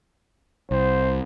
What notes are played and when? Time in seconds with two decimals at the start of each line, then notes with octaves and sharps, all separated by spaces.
0.71 C2 C5